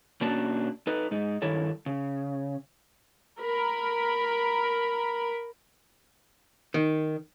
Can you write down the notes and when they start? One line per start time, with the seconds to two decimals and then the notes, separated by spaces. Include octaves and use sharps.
0.21 B2 A#3 C#4 D4 F#4 A5
0.87 D#4 A4 B4
1.11 G#2 G#3 D#4
1.42 G2 D#3 E4 A4 C#5
1.86 C#3
3.39 A#4 B5
6.74 D#3